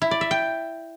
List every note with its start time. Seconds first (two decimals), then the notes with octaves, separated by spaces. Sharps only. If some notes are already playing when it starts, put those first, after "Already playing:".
0.02 E4
0.11 D5
0.21 E5
0.31 G5